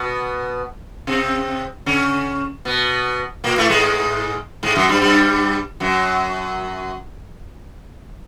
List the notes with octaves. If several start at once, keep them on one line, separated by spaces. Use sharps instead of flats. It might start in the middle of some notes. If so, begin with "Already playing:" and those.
Already playing: B2 B3
C3 C4
C#3 C#4
B2 B3
A#2 A#3
A2 A3
G#2 G#3
G#2 G#3
F#2 F#3
G2 G3
G2 G3
F#2 F#3